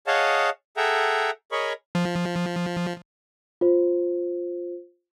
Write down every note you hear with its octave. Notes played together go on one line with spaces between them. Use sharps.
G#4 C#5 D#5 F5 F#5 A5
G#4 A4 E5 F#5 G5 A#5
G#4 A#4 C#5 D#5 B5 C#6
F3
F4 C5